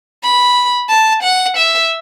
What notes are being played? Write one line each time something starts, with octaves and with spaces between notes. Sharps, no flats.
B5
A5
F#5
E5